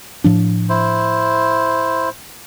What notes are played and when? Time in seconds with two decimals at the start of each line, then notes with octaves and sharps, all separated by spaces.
0.24 A2 F3 D4
0.69 E4 C5